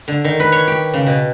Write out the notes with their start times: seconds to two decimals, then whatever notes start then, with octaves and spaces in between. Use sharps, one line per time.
0.08 D3
0.24 D#3
0.40 B4
0.52 C#5
0.67 G4
0.94 C#3
1.07 B2